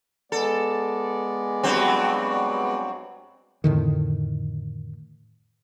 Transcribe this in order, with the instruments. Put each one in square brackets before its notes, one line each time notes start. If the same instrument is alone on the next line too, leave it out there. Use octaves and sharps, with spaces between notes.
[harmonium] G#3 B3 D5 [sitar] A4
[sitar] G2 F#3 C4
[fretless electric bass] F2 A2 D3 D#3